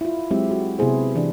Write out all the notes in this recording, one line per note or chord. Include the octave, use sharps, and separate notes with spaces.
E4 F4
F#3 G#3 C4 E4 G4 E5
F#4
C3 B3 E4 G#4 C5
E3 D4